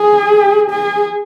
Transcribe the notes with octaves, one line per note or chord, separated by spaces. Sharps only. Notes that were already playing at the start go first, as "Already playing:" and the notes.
Already playing: G#4
G#4